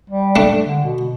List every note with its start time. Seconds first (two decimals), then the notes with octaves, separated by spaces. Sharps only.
0.10 G3
0.36 A3 D4
0.66 D3
0.84 B2